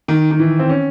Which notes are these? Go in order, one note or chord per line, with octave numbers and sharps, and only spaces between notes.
D#3
D#3
E3
C4
C#4